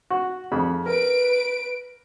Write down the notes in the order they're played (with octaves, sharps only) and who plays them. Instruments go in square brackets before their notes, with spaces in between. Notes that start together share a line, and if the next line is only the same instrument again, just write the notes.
[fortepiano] F#4
F2 G#4 B5
[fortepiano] A#4 [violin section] B4 D7